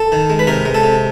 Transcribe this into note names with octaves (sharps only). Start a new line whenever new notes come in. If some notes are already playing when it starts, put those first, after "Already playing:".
Already playing: A4
D#3
G#3
B4
C3 A#4
G#3
A4
C3